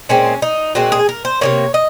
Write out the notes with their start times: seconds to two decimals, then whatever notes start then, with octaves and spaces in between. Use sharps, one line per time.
0.09 A#2 G#3 C4 C#4
0.42 D#4
0.75 A#2 G#3 C4 F#4
0.92 G#4
1.09 A#4
1.25 C5
1.41 C3 D#3 A#3 C#5
1.74 D#5